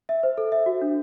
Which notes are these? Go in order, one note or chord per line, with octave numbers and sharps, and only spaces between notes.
E5
C5
A4
E5
F#4
D4